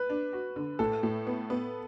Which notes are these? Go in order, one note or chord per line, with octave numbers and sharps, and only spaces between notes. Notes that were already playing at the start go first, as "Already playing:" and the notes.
Already playing: B4
D4
F#4
D3
A2 A4
A2
B3
B3